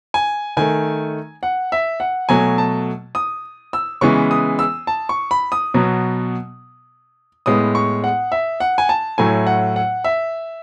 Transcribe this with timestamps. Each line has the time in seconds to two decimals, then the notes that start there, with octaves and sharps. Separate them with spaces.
0.14 G#5
0.57 D#3 A3 G#5
1.43 F#5
1.72 E5
2.00 F#5
2.29 B2 F#3 A3 G#5
2.58 A5
3.15 D#6
3.73 E6
4.01 C#3 E3 G#3 B3 C#6
4.31 D#6
4.59 E6
4.87 A5
5.09 C#6
5.31 B5
5.52 D#6
5.74 B2 F#3 B3
7.46 A2 G#3 B3 D#6
7.75 C#6
8.04 F#5
8.32 E5
8.60 F#5
8.78 G#5
8.89 A5
9.18 A2 F#3 A3 G#5
9.47 F#5
9.76 F#5
10.04 E5